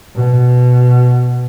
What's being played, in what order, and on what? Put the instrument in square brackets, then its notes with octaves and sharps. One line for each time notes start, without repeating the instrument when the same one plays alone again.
[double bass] B2